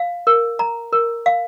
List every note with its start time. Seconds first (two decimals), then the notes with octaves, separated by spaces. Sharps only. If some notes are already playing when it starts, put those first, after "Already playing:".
Already playing: F5
0.27 A#4
0.59 A#5
0.93 A#4
1.26 F5